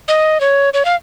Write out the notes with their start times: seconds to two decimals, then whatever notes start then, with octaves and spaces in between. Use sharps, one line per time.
0.08 D#5
0.41 C#5
0.74 C#5
0.85 F5